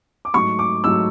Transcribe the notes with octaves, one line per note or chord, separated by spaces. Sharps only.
D6
G#2 F#3 A3 C#6
D6
G#2 F#3 A3 E6